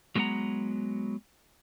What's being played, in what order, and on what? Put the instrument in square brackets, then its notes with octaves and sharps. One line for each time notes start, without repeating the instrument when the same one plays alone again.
[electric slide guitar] F#3 G#3 A3 B3 F#5 A#5